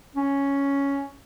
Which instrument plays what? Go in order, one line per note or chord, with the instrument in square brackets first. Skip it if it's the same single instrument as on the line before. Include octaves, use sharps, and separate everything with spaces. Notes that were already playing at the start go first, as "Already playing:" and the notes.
[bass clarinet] C#4